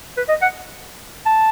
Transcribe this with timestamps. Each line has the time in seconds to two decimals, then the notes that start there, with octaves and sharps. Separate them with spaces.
0.17 B4
0.29 D#5
0.42 F#5
1.26 A5